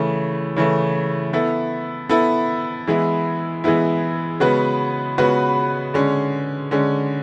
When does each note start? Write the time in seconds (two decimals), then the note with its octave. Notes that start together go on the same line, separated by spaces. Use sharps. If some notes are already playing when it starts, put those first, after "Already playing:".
Already playing: C#3 E3 A3
0.56 C#3 E3 A3
1.33 B3 E4 A4
2.09 B3 E4 A4
2.87 E3 G#3 B3 E4
3.64 E3 G#3 B3 E4
4.40 C#3 G#3 B3 F#4 B4
5.18 C#3 G#3 B3 F#4 B4
5.94 D3 G#3 C#4
6.71 D3 G#3 C#4